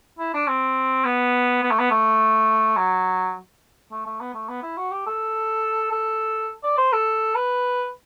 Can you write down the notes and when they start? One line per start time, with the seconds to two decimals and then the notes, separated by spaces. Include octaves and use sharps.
0.19 E4
0.34 D4
0.48 C4
1.05 B3
1.63 B3
1.71 A3
1.79 B3
1.91 A3
2.77 F#3
3.92 A3
4.06 A3
4.21 B3
4.34 A3
4.49 B3
4.63 E4
4.77 F#4
4.91 G4
5.06 A4
5.92 A4
6.64 D5
6.78 C5
6.93 A4
7.35 B4